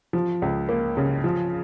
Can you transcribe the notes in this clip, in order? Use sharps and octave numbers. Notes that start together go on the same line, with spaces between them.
F3
C#2
A#3
C#3
F3